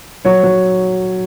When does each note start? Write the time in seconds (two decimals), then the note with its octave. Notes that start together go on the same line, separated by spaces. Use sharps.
0.25 F#3 C#5
0.43 F#3